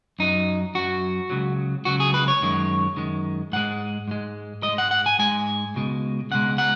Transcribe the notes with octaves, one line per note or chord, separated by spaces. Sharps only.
F#2 F#3 D#4
F#2 F#3 F#4
C#2 C#3 F#3
C#2 C#3 F#3 F#4
G#4
B4
C#5
F#2 D#3 G#3
F#2 D#3 G#3
G#2 G#3 F#5
G#2 G#3
G#2 D#5
G#3
F#5
F#5
G#5
G#2 G#3 G#5
C#2 B2 G#3
C#2 B2 G#3 F#5
F#5